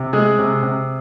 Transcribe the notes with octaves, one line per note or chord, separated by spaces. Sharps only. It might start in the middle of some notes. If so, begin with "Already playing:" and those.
Already playing: C3
G#3 G#4
C3
C3